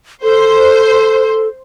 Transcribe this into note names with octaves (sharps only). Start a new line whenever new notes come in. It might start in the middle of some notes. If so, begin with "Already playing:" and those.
A4 C5